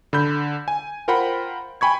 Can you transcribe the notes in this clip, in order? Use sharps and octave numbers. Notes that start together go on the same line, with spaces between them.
D3 B5 G6
G#5
F4 A#4 C5 F#5 G5 B5
G5 G#5 B5 C#6 G#6